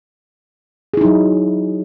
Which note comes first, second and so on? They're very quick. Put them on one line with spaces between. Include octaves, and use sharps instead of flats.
G#4 E4 D#4 F#3